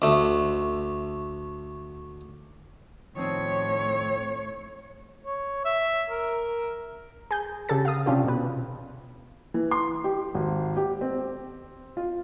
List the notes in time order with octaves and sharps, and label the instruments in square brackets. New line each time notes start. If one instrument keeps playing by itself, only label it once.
[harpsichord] D2 A3
[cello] A2 C#5 [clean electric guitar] D#3 F3 C4
[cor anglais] C#5
E5
A#4
[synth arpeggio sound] G#4 G6
C#3 G4 A4 A6
F5 D#6
C3 C#4 D4 F4 G4
B2 B4
[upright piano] E3
C6
G4
G#1
G4
C4
F4